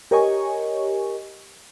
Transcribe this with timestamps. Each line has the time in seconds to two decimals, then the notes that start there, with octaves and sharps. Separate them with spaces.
0.11 G4 A#4 C#5 D#5 G#5 C#6